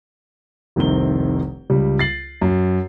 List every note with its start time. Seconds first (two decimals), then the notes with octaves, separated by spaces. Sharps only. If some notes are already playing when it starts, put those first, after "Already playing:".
0.76 F1 C2 D#3 C4 G7
1.70 C#2 G3
1.99 A6 C7 F#7
2.41 F#2